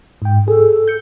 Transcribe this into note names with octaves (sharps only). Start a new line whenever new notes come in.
G#2 G5
G#4 A4
G6 C#7